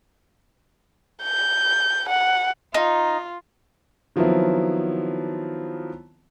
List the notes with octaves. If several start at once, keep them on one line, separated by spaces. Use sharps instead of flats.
G6
F#5
D#4 F4
D#3 F3 F#3 B3 C4 E4